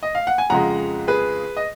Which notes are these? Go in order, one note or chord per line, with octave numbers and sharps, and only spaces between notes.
D#5
F5
F#5
G#5
F2 C#3 F3 G#3 F#5 A#5
G#4 B4
D#5